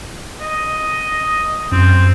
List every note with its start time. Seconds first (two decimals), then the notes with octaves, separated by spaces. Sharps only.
0.41 D#5
1.72 F#2 C4